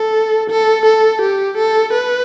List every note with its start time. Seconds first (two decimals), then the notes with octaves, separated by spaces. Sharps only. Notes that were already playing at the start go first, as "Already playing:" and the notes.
Already playing: A4
0.50 A4
0.86 A4
1.22 G4
1.57 A4
1.93 B4